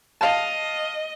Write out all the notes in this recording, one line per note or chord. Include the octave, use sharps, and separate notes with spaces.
D#5 F5 A5